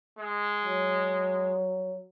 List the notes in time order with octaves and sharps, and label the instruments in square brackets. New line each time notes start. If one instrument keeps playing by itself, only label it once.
[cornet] G#3
[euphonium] F#3